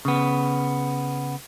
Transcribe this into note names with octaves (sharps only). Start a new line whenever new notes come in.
C#3 B3